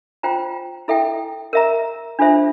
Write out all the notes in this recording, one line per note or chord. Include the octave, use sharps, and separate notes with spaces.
F4 C5 G5 A#5
E4 A4 E5 G5
A#4 E5 A#5
D4 F4 A4 C5 E5